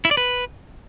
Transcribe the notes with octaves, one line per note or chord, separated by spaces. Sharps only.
E4
D5
B4